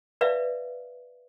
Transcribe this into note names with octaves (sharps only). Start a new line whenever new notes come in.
B4 D5 E5 F5